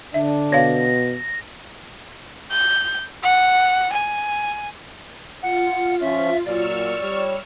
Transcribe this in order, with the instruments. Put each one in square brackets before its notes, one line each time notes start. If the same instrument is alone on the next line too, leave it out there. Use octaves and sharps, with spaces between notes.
[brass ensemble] D3 D4 [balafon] E5
[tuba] B2 [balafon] C#5 F5 [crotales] A#6
[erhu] G6
F#5
G#5
[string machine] F4 [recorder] F#5
[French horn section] F3 C#4 [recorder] E5
[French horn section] A#2 F#3 [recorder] D5 [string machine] C#6 E6 F6
[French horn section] G3 C#5